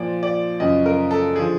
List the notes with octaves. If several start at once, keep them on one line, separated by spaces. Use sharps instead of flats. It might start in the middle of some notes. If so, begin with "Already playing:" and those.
Already playing: A#2 F3 D5
D5
F#2 C#3 F3 D#5
A#4
A4
D3 F3 G#4